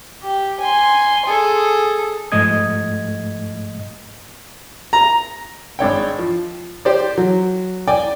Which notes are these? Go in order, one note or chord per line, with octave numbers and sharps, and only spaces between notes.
G4
G#5 C6
G#4 A4
G#2 F3 A3 D#5 D#6 G#6
A#5
G#1 D4 C#5 G5
F3
G4 C5 D5
F#3
D5 G5 G#5